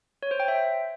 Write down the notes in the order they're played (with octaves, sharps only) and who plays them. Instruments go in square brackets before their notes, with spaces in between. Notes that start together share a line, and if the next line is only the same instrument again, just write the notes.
[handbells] C#5
C5
G5
E5